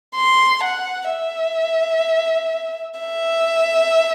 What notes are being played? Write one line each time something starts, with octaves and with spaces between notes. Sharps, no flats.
C6
F#5
E5
E5